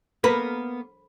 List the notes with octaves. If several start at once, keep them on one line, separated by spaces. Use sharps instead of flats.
A#3 B3 A#4 B4